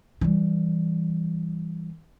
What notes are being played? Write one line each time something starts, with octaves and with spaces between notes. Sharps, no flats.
E3 G3